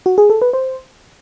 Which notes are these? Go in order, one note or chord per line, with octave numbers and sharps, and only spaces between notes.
F#4
G#4
A4
B4
C5